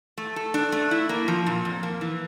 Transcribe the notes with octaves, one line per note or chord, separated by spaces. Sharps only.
A3
A4
D4
A3
E4
A#3
F3
A#2
F2
A#3
E3